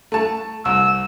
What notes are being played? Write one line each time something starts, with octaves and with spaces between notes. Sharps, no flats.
A3 A5
C2 E6